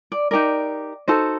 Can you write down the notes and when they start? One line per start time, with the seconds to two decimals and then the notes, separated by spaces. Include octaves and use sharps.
0.12 D5
0.31 D#4 G4 A#4 D5
1.08 D#4 F#4 A4 C5